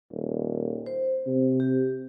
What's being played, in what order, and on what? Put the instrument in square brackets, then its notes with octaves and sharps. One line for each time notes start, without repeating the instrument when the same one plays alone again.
[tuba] D#1
[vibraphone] C5
[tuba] C3
[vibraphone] G4